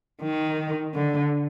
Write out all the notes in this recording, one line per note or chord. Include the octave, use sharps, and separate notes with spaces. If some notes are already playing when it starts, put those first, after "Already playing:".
D#3
D3